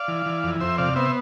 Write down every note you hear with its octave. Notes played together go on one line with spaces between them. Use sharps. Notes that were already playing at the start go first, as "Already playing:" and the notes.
Already playing: D5 F5
E3
E3
F2
F2 C5 E5
C3 D5 F5
B3 C5 E5